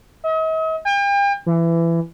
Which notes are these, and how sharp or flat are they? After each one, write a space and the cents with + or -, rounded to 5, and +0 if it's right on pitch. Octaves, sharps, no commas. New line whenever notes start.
D#5 +45
G5 +40
E3 +20